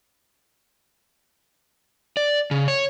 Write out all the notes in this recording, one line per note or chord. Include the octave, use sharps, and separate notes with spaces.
D5
C#3
C#5